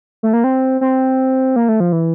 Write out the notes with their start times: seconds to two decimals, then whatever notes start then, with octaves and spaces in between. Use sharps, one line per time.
0.23 A3
0.33 A#3
0.44 C4
0.81 C4
1.56 A#3
1.69 A3
1.80 F3
1.92 E3